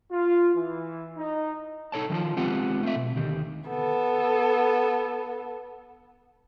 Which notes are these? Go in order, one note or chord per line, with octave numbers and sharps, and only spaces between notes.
F4
E3
D#4
D#4 A4 C#5 A5
D#3 F3 C#4 F4 A5
G#3 B3 C4 F4 G4 F#5
A3 C4 E5
B2
D2 D#3 G4
B3 A4